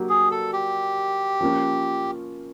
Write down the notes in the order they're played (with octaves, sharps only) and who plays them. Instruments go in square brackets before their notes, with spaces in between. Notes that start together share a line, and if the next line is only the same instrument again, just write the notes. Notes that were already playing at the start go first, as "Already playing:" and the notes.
Already playing: [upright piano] F#3 A#3 D4 G4
[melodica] G#4
A4
G4
[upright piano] F3 A#3 C#4 F4